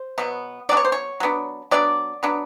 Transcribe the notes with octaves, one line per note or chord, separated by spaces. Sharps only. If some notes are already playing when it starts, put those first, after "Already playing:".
Already playing: C5
B2 F#3 B3
F#3 B3 D4 D5
C#5
C5
C#5
F#3 B3 D4
F#3 B3 D4 D5
F#3 B3 D4